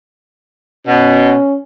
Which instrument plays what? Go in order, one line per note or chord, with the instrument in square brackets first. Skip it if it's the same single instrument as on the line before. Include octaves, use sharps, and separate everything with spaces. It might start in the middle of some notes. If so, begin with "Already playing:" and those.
[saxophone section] B2 [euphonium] C#4